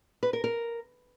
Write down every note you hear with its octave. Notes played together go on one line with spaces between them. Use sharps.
B4
A#4
A#4